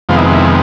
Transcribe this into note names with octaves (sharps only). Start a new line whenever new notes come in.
F2 C3 D#3 G#3 B3 F4
E4
E4